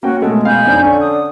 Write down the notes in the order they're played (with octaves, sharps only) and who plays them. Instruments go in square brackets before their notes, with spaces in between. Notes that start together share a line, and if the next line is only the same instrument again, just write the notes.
[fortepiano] A#3 C#4 G5 [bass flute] F#4
[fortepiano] B2 A3 [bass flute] G#3
[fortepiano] B2 F5 [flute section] G#5 B5 G6
[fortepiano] F2 D4 [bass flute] D#4
[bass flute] D3 [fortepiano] C#4 [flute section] C#6
[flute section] D#6